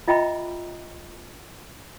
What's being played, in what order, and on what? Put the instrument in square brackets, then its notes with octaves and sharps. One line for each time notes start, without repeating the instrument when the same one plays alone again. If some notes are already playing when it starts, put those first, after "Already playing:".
[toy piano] F4 D#5 E5 G5 A#5 B5